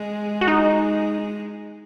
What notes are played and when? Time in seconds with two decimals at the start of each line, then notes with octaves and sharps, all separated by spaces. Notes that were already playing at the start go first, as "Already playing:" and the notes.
Already playing: G#3
0.41 F#4
0.48 D#4